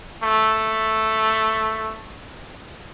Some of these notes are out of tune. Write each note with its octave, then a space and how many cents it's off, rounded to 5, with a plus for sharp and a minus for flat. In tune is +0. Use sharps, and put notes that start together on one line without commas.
A3 +0